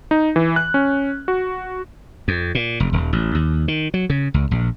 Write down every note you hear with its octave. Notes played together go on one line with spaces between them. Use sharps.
D#4
E3
F#6
C#4
F#4
F2
A#2
F1
D#1
A1
D#2
D#3
F#3
C#3
C#2
A#1